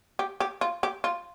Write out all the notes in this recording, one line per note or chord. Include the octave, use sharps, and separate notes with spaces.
G4
G4
F4
G4
F4